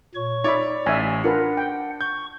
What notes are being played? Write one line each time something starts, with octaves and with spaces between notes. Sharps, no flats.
A#2 C#5 C#6
D#4 C#5 D5 E5 B5 D6
A1 E5 G#5
D4 F4 A#4 B4 F#5
G5
C#6 G6